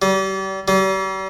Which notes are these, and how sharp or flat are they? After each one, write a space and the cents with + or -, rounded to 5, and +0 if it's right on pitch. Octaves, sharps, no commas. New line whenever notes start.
G3 -35
G3 -40